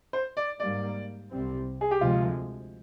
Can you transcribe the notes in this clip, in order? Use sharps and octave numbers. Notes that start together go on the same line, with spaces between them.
C5
D5
G#2 G3 A#3 D5
C2 C3 G3 C4
G#4
G4
D2 C3 F3 G#3 F4